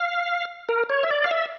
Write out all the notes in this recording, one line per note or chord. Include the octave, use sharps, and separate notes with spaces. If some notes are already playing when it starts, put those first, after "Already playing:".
Already playing: F5
A#4
C#5
E5
D5
F5
E5